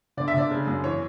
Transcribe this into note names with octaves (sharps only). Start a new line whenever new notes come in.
D3 D5
E5
D3 D5
C#3
F#2
E3 C#5